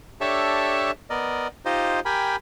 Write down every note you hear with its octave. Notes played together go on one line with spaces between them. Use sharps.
D4 G4 A4 C#5 E5 A5
B3 A#4 D5 D#5
D#4 F4 G4 C5 D#5
G4 A#4 G5 G#5 B5